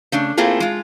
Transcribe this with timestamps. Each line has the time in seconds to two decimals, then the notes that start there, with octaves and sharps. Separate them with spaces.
0.12 C#3 A3 D4
0.37 A3 A#3 C4 E4 F4 G#4
0.60 G#3 F4